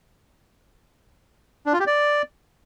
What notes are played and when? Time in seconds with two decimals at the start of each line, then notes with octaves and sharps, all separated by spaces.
1.66 D4
1.73 F4
1.80 G4
1.87 D5